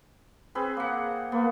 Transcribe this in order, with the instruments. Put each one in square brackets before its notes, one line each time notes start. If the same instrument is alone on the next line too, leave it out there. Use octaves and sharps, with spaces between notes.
[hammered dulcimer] C4 G#4 B4
A#3 F#5
[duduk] A#3 [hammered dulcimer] B3